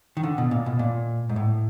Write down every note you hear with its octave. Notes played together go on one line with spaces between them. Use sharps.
D#3
D3
B2
A#2
B2
A#2
G#2
A2